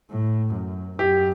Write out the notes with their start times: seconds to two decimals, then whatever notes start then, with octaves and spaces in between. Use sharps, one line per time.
0.11 A2
0.55 F#2
0.99 F#2 G4